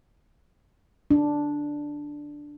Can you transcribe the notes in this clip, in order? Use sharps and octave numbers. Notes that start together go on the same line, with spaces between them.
D4